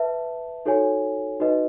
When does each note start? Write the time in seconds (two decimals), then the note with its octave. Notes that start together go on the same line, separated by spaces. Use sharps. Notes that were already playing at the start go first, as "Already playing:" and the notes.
Already playing: B4 E5 A5
0.66 D#4 F#4 A4 C#5 G#5
1.40 D#4 F#4 B4 D#5